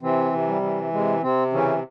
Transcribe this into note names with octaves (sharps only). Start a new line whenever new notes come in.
C3 E3 C4
C3
G3
E3
C3 G#3
C3 C4
C#3 E3 C#4